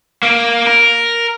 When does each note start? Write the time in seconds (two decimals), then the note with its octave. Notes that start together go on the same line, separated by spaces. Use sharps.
0.23 A#3
0.67 A#4